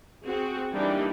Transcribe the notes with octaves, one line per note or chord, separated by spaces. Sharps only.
C4 F#4 G#4
E3 G3 A#3 D4 D#4 G4